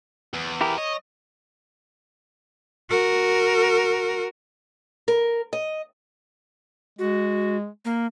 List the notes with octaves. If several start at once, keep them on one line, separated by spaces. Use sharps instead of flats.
E2
E4 G4 A#4
C#5 D#5
F#4 A#4
A#4
D#5
G#3 F#4
A#3